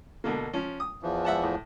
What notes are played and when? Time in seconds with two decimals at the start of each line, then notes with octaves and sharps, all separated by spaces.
0.24 B2 D3 A#3
0.53 F3 C#4
0.80 D#6
1.03 E2 E3 F3
1.25 E5 F#5 A5
1.43 A2